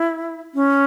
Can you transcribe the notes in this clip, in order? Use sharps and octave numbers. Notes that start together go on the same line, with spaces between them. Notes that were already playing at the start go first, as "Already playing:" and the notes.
Already playing: E4
C#4